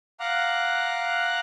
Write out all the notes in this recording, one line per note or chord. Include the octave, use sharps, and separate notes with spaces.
F5 F#5 A#5 D6 F#6